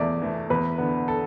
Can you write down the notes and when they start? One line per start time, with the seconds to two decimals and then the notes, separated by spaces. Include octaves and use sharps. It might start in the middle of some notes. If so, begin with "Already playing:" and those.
Already playing: E2 E3 A3 D5
0.22 E3 A3
0.50 E2 B4
0.78 D3 B3
1.08 A4